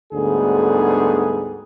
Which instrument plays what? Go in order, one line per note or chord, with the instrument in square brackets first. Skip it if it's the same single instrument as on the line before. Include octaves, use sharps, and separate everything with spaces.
[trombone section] D2 G#2 D3 G3 B3 G#4